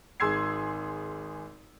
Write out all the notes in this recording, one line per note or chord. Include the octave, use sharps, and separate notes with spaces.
G#1 G#4 C6 E6 G#6 C7